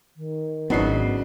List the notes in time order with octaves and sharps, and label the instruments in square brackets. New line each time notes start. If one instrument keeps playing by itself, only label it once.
[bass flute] D#3
[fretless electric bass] G#1 B3 [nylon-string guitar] C#3 F#3 [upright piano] D4 D#4 C7